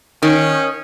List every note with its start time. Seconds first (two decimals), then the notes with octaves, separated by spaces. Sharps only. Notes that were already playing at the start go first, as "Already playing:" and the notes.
0.23 D#3 C#4